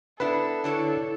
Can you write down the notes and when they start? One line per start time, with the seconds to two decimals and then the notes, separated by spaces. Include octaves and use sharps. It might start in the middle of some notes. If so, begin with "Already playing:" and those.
0.20 B3 D4 E4 A4 B4
0.64 D3 D4 E4 C#5